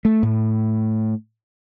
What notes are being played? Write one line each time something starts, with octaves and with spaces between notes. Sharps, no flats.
A3
A2